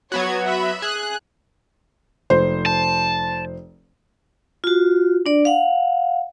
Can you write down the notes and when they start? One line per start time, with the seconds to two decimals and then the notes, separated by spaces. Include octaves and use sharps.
0.12 F#3 B3 F#4 C#5 G#6
0.45 E5 B5
0.82 G#4 F#6
2.30 F1 C5
2.66 A5
4.64 F4 F#4
5.26 D4 D5
5.45 F5 F#5